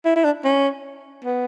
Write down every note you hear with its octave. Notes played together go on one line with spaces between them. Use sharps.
E4
E4
D4
C#4
B3